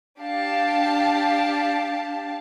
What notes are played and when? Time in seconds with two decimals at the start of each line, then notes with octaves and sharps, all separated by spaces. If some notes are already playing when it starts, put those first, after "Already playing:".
0.19 D4 G4 F5 A5